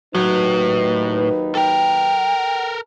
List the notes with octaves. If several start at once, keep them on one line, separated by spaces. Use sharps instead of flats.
D#2 A2 F#3 D#4 B4
A4 A#4 G5